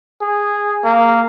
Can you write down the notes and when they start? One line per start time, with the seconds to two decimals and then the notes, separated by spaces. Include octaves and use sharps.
0.21 G#4
0.84 A#3